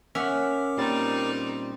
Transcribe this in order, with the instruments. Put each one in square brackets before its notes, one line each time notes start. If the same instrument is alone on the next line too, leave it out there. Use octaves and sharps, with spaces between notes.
[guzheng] C#4 F#5 [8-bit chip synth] A#4 D6 [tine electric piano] E5 F6
[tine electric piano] A#2 G3 A6 [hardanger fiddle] C4 D#4